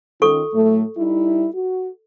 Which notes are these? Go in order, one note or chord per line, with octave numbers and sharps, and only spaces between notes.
D#3 C#4 F4 A4 C#6
A2 F#3 A3
G3 D#4 E4
F#4